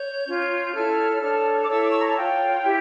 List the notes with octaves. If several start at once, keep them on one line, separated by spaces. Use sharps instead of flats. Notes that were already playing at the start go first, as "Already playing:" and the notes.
Already playing: C#5 G6
C#4 F4 C#5
G6
E4 A4 C#5 F6
D4 A4 C#5
D6
E4 A4 C#5 E6
D6
C#6
A#5
A5
F4 C#5 G5
E4 G4